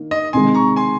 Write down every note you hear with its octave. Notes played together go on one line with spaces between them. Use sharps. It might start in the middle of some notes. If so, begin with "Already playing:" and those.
Already playing: D#3 A#3
D#5
C3 D#3 G#3 G#5 C6
A#5 C#6
G#5 C6